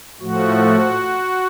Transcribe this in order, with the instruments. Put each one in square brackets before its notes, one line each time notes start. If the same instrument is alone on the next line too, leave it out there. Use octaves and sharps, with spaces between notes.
[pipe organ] A2 F3 A3 F#4